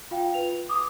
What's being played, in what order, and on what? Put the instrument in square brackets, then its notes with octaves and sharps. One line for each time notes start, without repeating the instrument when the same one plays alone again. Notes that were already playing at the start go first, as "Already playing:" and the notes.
[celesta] F4 F5 G5
F4 B4 F7
[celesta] D6 [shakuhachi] D#6